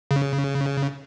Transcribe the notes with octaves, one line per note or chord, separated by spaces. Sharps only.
C#3